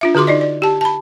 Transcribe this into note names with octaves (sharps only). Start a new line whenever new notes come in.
D4 F4 E5
D3 F#4 G#4 C6 D6
D#4 D5 D#5
D5
G4 A5
A5 B5